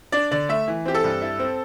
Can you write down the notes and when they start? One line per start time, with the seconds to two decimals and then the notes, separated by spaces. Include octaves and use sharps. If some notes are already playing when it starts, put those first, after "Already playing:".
0.12 D4 D5
0.31 D3 D5
0.49 A3 E5
0.68 E3
0.85 C4 G4
0.95 A4
1.04 G2
1.22 E4
1.39 C4